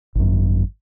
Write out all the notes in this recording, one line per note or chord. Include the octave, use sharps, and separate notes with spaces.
G#1 F#2